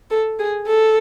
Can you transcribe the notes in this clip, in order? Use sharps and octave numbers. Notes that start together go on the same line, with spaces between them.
A4
G#4
A4